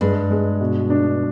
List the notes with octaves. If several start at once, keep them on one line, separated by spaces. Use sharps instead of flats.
G2 G#3
G#3
B2
D4